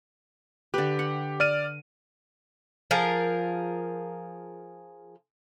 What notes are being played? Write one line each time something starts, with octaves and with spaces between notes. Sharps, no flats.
D3 G4 B4
F#5
D5 F6 D#7
F3 G#4 A#4